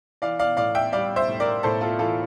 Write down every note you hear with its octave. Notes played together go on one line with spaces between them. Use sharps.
E3 D5 F5
D5 F5
A2 D5 F5
E5 G5
G3 D5 F5
C5 E5
A2
A#4 D5
A2 A4 C5
F4 A4
E3 F4 A4